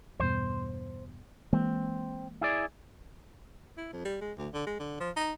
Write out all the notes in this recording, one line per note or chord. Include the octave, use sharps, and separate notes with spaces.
E2 G2 B2 C5
E3 G#3 A#3 C4
E4 G#4 D5
E4
F2
G3
G#3
D2
D3
G#3
D3
F3
D#4